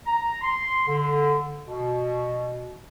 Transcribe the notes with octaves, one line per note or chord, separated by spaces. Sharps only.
A#5
C6
D3
B2